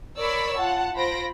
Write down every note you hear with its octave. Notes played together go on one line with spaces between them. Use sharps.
A#4 C#5 D5 B5 C#6 E6
F4 F#5 A5
F4 C5 B5 A#6 D7